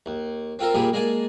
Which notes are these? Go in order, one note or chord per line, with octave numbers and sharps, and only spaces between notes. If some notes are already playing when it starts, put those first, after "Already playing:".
D#2
C4 F4 A4 A#4
A#2 G3 A#3 G4 G#4
G#3 A#3 D5 G#5 A5